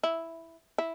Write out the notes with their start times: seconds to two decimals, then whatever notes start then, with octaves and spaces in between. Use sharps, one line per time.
0.03 E4
0.78 E4